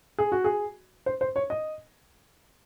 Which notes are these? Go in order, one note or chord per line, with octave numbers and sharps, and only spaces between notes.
G#4
F#4
G#4
C5
C5
C#5
D#5